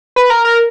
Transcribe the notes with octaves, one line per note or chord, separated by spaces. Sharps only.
B4
A#4
A#4